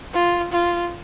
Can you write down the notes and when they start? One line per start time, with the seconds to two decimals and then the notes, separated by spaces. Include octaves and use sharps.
0.14 F4
0.53 F4